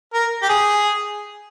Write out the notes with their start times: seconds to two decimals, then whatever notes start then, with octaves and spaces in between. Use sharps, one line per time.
0.14 A#4
0.42 G4
0.49 G#4